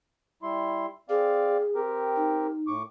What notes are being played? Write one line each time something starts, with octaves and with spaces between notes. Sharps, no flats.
G3 E4 C6
C4 G#4 D5 F5
C4 G4 A#4
D#4
A2 C#6 D6